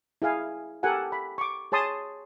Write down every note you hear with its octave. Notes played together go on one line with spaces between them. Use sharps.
E4 G#4 F5 G#5
G4 A4 A#4 F#5 G#5
B5
C#6 D6
G#4 C#5 A5 C6 D#6